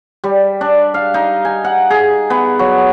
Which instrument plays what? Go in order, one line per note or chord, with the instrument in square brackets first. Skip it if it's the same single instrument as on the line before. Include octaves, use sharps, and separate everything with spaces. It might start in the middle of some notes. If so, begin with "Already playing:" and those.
[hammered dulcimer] G3
D4
F5
D#4
G#5
F#5
G#4
B3
F#3